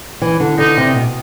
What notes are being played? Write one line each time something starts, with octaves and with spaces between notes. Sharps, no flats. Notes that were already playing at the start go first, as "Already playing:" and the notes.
E3
D3
D3 D#4
C3
B2